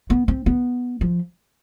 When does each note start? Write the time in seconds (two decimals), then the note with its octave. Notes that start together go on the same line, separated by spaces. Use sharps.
0.10 B3
0.28 C4
0.46 B3
1.01 F3